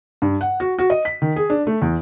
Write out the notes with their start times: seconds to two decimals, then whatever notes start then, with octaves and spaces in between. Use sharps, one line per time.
0.22 G2
0.41 F#5
0.60 F#4
0.79 F#4
0.90 D#5
1.05 B6
1.22 D#3
1.36 G#4
1.50 D4
1.67 A3
1.82 E2